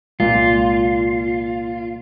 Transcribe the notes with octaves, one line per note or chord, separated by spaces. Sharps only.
C2 A#2 G#3 F4